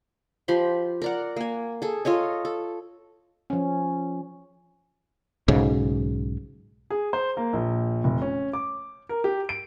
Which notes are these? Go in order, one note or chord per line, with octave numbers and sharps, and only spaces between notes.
F3 G4 B5 C6
A#4 D5 F#5
A#3 G#5
G#4 A4
F4 A4 C#5 D#5
A4
F3 C#4
B1 G#2 C#3
G#4
C5
A#3
A#1
F1
C#4
D6
A#4
G4
D7